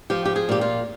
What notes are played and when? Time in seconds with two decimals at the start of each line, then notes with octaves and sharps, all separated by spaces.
0.10 F3 G4
0.25 G4
0.36 G#4
0.49 A#2 G4
0.61 F4